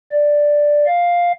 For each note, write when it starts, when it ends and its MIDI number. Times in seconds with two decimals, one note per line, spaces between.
0.12 0.86 74
0.87 1.32 77